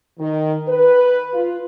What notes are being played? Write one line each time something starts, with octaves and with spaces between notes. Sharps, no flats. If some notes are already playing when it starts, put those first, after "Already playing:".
D#3
B4
F4